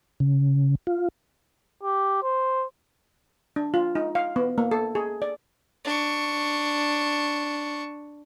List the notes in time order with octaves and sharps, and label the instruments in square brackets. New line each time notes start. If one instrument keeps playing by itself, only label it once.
[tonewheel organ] C#3
F4
[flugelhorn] G4
C5
[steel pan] D4
F4
D#4
F5
B3
A#3
A4
G#4
D5
[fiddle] D4 C#6